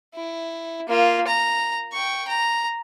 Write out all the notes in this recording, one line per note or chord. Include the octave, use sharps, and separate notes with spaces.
E4
A#3 F4
A#5
G5 C#6
A#5